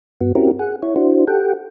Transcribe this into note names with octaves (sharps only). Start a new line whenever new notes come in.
G2 B3 F#4
C4 C#4 E4 F#4 G4 A#4
G#4 F#5
E4 C#5
D4 E4 F#4 C5
G4 A4 F#5 G5